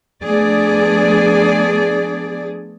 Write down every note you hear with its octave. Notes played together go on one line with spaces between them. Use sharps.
F3 A3 B3 D4 G#4 D5